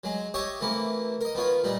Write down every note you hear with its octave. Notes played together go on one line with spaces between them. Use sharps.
F#3 G#3
G4 C#5 D#5 E5 C#6
C3 E3 A3 A#3 E4
A#4 D#5
D#3 B3 F4 C#5
A#2 G3 D#4